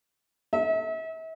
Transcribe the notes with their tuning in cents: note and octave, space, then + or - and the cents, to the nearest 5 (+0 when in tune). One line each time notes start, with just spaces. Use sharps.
E5 -40